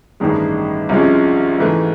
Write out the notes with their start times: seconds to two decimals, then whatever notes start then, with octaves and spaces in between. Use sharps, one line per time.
0.20 A1 G2 D#3 G#3
0.89 C2 C3 F3 G#3 C#4
1.58 G#2 E3 A3